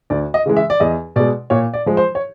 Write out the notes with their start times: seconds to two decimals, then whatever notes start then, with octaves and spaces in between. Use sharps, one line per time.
0.10 D2 D5
0.34 D#5
0.46 C#3 E3 G#3
0.57 E5
0.70 D5
0.80 E2 D#5
1.16 B2 G#3 D5
1.50 A#2 C#5
1.74 D5
1.86 F3 G#3
1.97 C5
2.15 C#5